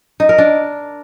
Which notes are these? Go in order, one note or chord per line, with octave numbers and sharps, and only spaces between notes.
D#4
A#4
D4